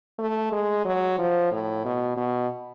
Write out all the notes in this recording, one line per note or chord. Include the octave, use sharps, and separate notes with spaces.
A3
G#3
F#3
F3
A2
B2
B2